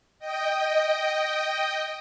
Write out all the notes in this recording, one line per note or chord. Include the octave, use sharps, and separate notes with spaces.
D#5 G5